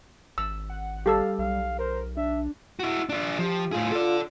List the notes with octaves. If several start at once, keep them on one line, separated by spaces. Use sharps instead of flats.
G#1 E6
F#5
G3 G4 A4 F5 E6
B1 F5
A#4 C5
D4 E5
E4 F#4
D4 F4
F3 G4
A2 F4 G#4
A4 D5